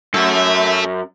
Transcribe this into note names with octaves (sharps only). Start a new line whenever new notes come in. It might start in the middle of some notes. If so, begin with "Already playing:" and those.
F#2 A4 E5